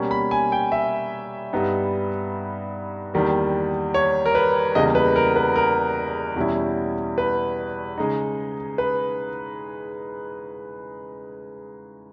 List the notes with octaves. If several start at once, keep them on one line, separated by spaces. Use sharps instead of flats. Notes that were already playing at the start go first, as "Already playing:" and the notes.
Already playing: B2 G3 A#3 C#4
B5
G#5
G5
E5
G2 G3 B3 D#4
E2 D#3 G3 A#3
C#5
A#4
B4
E2 C#3 E3 G3 A#3 D#5
B4
A#4
B4
A#4
E2 B2 G3 C#4 E4
B4
C#3 G#3 D#4
B4